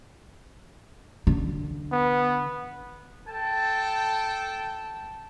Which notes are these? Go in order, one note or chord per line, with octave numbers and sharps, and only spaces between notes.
D3
B3
A4 G5 A5